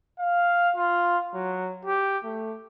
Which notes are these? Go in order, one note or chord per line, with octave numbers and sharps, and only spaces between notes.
F5
F4
F#3
G4
A3